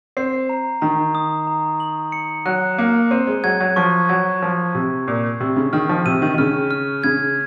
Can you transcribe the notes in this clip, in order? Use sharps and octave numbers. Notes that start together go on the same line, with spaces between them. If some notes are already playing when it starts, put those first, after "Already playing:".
C4 C7
A#5
D#3 A#5
D#6
A#5
F#7
C#7
F#3 F#6
A#3 C#7
C4 D#7
G#3
F#3 G#6
F#3
F3 C#6
F#3 G#6
F3 C#6
C3 C#6
A#2 C7
C3 C#6
C#3
D#3 F6
F3
C3 D#7
D#3
D#3
C#3 F6
F6
C#3 G#6